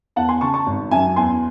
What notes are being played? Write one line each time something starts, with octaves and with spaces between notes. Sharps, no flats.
E2 F#5 A5
G#5 C6
C#3 A5 C#6
A5 C#6
G#1
F#2 E5 G#5
E2 G#5 C6